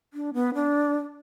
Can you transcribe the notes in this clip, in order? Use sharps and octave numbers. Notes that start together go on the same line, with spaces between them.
D4
B3
D4